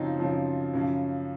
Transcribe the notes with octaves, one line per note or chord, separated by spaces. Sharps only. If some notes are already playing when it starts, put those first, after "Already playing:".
Already playing: F#2 C#3 F3 C4 D#4
F#2 C#3 F3
F#2 C#3 F3